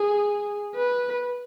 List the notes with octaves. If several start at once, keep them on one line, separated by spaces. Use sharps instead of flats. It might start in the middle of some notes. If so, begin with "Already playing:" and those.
Already playing: G#4
B4